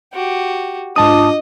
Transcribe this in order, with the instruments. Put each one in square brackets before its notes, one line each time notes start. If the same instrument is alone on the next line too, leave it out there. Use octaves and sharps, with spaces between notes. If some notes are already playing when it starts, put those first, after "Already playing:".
[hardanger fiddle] F#4 G4
[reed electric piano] G#2 A5 D#6 [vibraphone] D4 F4 D6 [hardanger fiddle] D#5